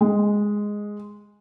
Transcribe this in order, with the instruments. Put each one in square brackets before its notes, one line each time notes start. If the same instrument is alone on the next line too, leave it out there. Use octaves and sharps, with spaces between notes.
[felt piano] G#3